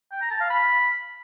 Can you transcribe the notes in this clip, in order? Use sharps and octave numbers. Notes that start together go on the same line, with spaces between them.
G5
A#5
A5
F5
B5